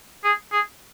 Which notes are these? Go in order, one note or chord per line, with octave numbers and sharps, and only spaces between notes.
G#4
G#4